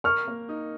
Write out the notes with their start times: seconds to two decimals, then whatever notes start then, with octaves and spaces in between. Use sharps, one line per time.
0.04 A#4 C#6 F6
0.27 A#3
0.49 D#4